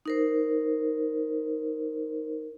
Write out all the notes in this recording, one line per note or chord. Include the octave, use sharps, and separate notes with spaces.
D#4 A#4 C5